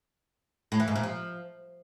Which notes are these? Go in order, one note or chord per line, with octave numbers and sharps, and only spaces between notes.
A2
E3
G#2
A#2
F3